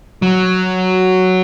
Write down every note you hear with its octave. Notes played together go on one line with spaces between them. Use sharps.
F#3